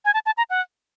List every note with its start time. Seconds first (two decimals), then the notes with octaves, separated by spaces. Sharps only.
0.05 G#5
0.14 A5
0.26 A5
0.38 A#5
0.50 F#5